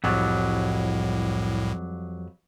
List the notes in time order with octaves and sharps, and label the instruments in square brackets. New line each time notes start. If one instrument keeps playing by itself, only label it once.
[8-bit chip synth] C2 A2 [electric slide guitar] F2 F#3 G3